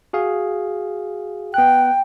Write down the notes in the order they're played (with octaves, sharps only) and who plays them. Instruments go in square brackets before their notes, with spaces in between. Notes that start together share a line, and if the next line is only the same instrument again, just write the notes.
[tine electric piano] F#4 G#4 F5
[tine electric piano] B3 F#6 [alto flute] G5